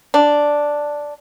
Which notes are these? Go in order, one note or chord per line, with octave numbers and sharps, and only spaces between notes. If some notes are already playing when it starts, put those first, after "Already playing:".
D4